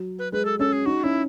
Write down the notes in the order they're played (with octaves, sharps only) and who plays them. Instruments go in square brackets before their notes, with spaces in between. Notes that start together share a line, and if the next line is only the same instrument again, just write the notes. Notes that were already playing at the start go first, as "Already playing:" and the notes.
Already playing: [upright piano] F#3
[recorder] B4
[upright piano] G#3 [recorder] B4
[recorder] A4
[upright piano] C#4 [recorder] A4
[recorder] G#4
[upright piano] D#4 [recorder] F#4
[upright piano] C#4 [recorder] E4